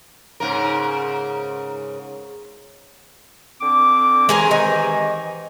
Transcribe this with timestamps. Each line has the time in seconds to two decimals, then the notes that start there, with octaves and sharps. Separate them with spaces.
0.40 G#2 C#3 A#4
3.61 D3 C4 D6
4.29 C3 D#3 E3 G#3 G#4 A#4
4.51 D#4 G#5